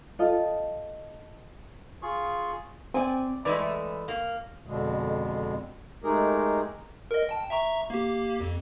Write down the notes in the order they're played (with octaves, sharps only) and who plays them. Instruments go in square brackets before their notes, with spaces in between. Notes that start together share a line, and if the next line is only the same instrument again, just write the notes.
[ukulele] F4 A4 D#5
[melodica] F4 G#4 C#6
[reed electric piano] C4 [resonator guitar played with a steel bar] D5 G#5
[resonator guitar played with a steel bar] E3 G#3 A3 [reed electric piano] B4 D5
[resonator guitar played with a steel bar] A#3
[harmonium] F2 B2 D3 G#3
G#3 A3 D#4 G4 G#4 A#4
[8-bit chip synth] A#4 D#5
G5 A5
E5 A#5 C#6
A#3 G4
F2